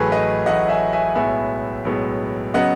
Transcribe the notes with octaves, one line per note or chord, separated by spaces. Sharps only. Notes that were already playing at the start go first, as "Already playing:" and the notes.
Already playing: A1 A2 F#3 A3 G#4 B4
B4 D#5
A1 A2 F#3 A3 D#5 F#5
E5 G#5
E5 G#5
B1 A2 G#3 B3 E5 G#5
B1 A2 G#3 B3
C#3 F#3 B3 D#5 F#5